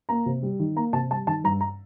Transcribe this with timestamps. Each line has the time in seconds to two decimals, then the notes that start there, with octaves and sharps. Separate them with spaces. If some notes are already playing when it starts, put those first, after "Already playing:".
0.09 A#3 A#5
0.26 C3
0.43 G3
0.60 D#3
0.76 A#3 A#5
0.93 C3 A5
1.11 G3 A5
1.27 D#3 A5
1.44 G2 A#5
1.61 A#5